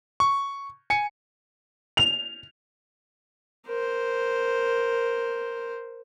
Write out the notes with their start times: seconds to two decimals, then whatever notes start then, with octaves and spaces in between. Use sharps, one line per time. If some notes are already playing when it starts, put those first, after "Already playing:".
0.20 C#6
0.90 G#5 C#7
1.97 F7
3.67 A#4 C5